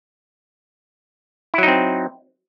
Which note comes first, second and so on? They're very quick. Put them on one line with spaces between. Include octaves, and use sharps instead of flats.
E4 F#3 D#4 C4